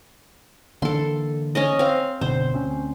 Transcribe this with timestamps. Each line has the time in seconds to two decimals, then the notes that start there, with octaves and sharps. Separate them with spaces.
0.82 D3 E3 A#3 A4 C6
1.55 C#4 C#5 D#5
1.79 C4 F5
2.21 F#1 B2 D3 C5
2.54 D2 C4 C#4